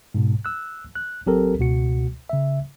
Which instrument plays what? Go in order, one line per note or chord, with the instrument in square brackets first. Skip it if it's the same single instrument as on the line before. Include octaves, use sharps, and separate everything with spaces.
[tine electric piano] G#2 B2
E6 F#6
F#6
A1 F#3 C4 G4 A4 A#4
C#2 B2 F#4 C#7
C#3 E5